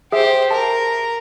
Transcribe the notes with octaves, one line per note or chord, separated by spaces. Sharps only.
G4 G#4 C5 E5
A#4 A5